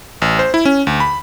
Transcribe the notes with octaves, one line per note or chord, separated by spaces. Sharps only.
A1
C5
E4
C#4
D2
B5